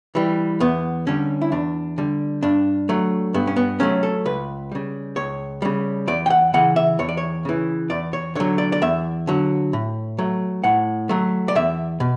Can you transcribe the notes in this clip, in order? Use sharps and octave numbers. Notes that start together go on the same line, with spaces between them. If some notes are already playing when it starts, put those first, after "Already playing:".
E3 G3
E2 B3
D3 G3 C#4
E4
E2 D4
D3 G3
G2 D4
F#3 A3
G2 B3
C#4
B3
F#3 A3 C#4
A4
C#2 B4
C#3 G3
C#2 C#5
C#3 G3
E2 D5
G5
F#5
C#3 E3 F#5
E5
E2 C#5
D5
C#5
C#3 E3
E2 D5
C#5
D3 F#3 C#5
D5
D5
E2 E5
D3 F#3
A2
F#3 A3
A2 F#5
F#3 A3
D5
E2 E5
B2